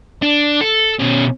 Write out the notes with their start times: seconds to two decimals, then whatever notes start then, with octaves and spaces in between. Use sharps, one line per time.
0.22 D4
0.61 A4
0.99 B2 C#4